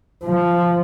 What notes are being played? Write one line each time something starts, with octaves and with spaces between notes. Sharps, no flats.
F3